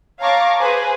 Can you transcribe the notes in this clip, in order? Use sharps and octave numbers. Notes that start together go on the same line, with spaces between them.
C#5 F5 A5 A#5 C#6 D6
G#4 B4 C5 G#5